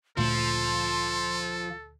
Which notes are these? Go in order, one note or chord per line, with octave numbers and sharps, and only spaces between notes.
D2 A#2 F3 A3 A4 C6